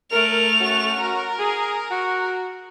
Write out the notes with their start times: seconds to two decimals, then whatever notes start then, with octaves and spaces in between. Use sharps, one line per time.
0.11 A3 A#4 F7
0.59 C#4 F#4
1.00 A#4
1.38 G#4
1.90 F#4